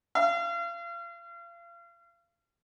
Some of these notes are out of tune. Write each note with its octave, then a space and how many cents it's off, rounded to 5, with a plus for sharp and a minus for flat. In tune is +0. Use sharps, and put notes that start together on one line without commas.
F5 -35